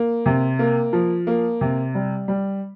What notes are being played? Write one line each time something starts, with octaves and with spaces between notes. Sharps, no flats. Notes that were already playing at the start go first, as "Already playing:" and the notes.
Already playing: A#3
C3
A#3
F3
A#3
C3
G3
G3